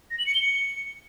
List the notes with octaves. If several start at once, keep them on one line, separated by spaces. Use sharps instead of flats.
A#6
F#7
C#7
G7
C#7